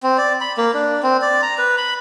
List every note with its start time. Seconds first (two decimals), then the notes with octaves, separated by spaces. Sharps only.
0.03 C4
0.18 D5
0.41 B5
0.57 A#3
0.74 D4
1.03 C4
1.22 D5
1.43 A#5
1.58 B4
1.78 B5